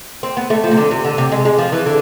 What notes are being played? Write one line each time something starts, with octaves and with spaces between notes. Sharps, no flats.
C4
B3
A3
F3
C3
D3
C3
D3
C3
G#3
G#3
F3
E3
D3